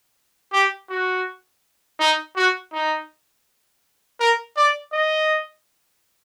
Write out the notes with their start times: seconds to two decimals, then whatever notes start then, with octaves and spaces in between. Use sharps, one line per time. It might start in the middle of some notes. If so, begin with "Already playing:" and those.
0.53 G4
0.89 F#4
2.00 D#4
2.36 F#4
2.73 D#4
4.20 A#4
4.57 D5
4.93 D#5